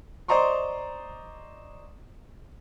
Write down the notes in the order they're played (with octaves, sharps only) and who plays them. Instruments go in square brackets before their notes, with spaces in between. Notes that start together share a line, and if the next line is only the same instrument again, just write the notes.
[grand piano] C5 D5 D#5 A#5 C6 C#6